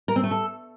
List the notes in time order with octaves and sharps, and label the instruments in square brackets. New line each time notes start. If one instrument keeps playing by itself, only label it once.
[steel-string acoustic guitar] A#4
C4
A3
A4